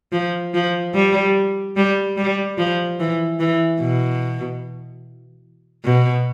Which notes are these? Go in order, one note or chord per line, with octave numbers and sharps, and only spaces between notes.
F3
F3
G3
G3
G3
F3
E3
E3
B2
B2